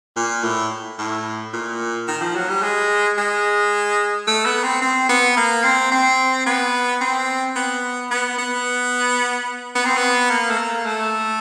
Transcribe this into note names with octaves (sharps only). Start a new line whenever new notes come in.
A#2
A2
A2
A#2
D#3
F3
F#3
G3
G#3
G#3
A3
B3
C4
C4
B3
A#3
C4
C4
B3
C4
B3
B3
B3
B3
C4
B3
A#3
A3
A#3
A3